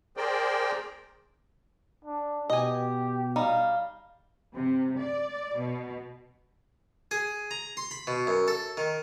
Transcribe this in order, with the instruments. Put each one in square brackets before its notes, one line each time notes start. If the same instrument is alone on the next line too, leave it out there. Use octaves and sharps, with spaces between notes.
[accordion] G#4 A#4 C5 D5 G5
[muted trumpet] D4
[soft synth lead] B2 [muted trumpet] G4 [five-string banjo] D#5 G#5
[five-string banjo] G3 D#4 [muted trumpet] F5
[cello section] C3
D5
B2
[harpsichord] G#4
A#5
C6
B5
B2
F#2
A4
D#3